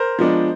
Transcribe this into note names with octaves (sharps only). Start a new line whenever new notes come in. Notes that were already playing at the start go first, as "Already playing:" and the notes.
Already playing: A#4 C5
F3 G#3 B3 D4